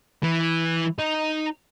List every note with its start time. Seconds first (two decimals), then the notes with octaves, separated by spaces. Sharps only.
0.23 E3 E4
0.99 D#4